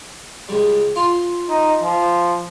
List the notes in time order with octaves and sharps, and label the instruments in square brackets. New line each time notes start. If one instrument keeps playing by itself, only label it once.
[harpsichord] C#2 G3
F4 C6
[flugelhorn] D#4
F3